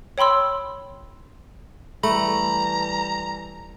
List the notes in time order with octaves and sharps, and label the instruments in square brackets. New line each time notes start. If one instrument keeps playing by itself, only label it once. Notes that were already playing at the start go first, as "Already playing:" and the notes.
[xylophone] C#5 G5 B5 C6 E6
[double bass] E3 G3 [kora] A3 [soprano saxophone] A#5 [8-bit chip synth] B5